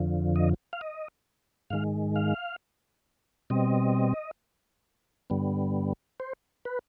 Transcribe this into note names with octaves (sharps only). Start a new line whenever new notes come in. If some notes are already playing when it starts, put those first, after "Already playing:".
Already playing: F2 D3 F3
D#5
F5
D#5
G#2 D#3 G#3 F5
F5
B2 G3 C4 D#5
G2 D3 G3 B3
C5
B4